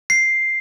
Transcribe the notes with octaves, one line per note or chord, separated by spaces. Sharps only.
C7